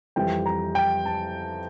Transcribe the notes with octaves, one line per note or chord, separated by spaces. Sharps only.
F2 E3 G3 G5
A#5
G5
A5